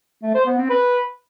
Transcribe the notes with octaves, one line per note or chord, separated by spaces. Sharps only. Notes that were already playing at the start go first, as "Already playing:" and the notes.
A3
C5
B3
C4
B4